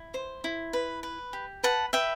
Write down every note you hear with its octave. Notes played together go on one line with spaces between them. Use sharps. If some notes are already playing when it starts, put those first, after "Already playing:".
Already playing: E4
C5
E4
B4
B4
G4
B4 F#5 A5
B4 E5 G5